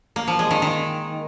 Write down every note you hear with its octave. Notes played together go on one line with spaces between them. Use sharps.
A#3
F3
G#3
D#3
D#3